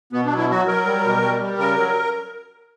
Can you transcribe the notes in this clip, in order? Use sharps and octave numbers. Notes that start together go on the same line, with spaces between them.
B2 B3
D4
F#3
E4
F#3 F#4
F#3 A#4
G3
B2
G3
G3
C#3 A#4
F#3